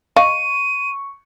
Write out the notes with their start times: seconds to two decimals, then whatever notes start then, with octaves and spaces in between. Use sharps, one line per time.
0.16 D#5 F5 C#6 D#7